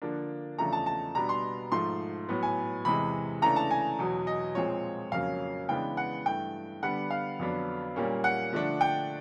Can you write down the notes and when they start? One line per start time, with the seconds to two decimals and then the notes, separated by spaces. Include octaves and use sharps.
0.02 D3 F3 A#3 D4
0.58 E2 C#3 F3 A3 D4 A#5
0.73 A5
0.86 A5
1.15 B2 G3 B3 D4 A#5
1.29 C6
1.72 G#2 F3 A3 C6
2.29 A2 F#3 B3
2.43 G#5
2.85 E2 C3 E3 G#3 B5
3.42 C#3 E3 A3 D4 A#5
3.56 A5
3.71 G#5
3.99 E2 B2 F#3
4.27 D#5
4.55 A#2 F3 G#3 C4 C#5
5.12 F2 C#3 F#3 A#3 C#4 F5
5.69 C#3 E3 G#3 B3 D4 G5
5.97 F#5
6.26 G2 E3 A3 G5
6.82 D3 G3 B3 D4 F#5
7.11 F5
7.39 F2 D3 F#3 B3 D4
7.96 A#2 G3 A#3 C#4
8.24 F#5
8.53 D3 F3 A3 D4
8.81 G5